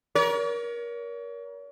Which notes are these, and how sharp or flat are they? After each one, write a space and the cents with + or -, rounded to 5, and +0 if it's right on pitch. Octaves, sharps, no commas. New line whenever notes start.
A#4 +25 C#5 +40